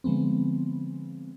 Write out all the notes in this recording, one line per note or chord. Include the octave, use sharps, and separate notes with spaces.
D3 F3 G#3 B3 C4